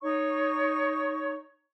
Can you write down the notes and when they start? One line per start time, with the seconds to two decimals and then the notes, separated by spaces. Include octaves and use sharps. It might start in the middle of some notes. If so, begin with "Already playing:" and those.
0.02 D#4 C#5 C#6